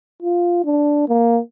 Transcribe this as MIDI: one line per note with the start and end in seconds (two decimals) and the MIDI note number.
0.22 0.60 65
0.65 1.04 62
1.09 1.39 58